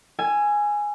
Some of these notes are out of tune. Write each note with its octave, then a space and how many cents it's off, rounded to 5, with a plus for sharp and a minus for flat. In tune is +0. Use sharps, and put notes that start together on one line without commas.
G#5 +0 E6 +35